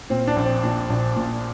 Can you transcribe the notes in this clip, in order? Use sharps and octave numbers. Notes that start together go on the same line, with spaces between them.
A#2 C4
D4
A#1
C4
A#2 D4
A#1
A#2